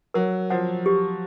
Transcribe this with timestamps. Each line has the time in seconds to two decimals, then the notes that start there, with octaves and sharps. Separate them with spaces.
0.14 F#3 A#4
0.50 F3 F#5
0.86 G4